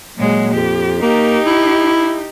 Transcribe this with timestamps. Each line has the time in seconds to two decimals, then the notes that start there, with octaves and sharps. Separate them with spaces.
0.18 A#2 F#3 G#3
0.54 F2 G4
1.02 A#3 D#4 G4
1.46 E4